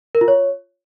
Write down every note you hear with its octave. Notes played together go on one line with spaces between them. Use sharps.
A#4
F4
C#5